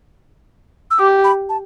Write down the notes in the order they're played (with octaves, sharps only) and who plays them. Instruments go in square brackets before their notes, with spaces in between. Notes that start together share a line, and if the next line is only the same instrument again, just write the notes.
[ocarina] E6
[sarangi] G4 [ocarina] D6
[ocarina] B5
A5